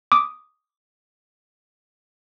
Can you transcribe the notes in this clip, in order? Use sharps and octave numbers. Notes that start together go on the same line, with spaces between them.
D6 D#6